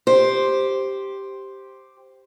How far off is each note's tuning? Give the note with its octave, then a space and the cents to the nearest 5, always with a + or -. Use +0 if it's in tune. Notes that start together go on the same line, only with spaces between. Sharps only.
G4 +0 C5 +0